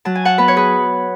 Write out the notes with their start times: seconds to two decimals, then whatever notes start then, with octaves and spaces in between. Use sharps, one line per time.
0.05 F#3 A5
0.15 G#5
0.25 F#5 A5
0.38 B3 B4
0.48 C#5
0.56 G#4 B4